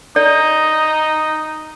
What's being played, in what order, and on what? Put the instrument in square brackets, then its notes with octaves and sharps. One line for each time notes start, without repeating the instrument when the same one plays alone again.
[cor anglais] D#4 [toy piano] D5